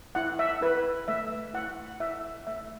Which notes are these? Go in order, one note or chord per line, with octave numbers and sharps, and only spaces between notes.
E4 F#5
E5
E4 B4
A3 E5
E4 F#5
E4 E5
A3 E5